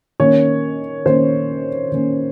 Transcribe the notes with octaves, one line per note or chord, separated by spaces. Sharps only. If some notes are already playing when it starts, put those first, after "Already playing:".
D#3 A#3 C#4 C#5
D#3 A#3 C#4 C5
D#3 A#3 C#4